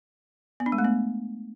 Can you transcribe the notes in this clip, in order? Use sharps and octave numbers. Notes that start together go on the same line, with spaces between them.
B3
D4
G#3
A3
B3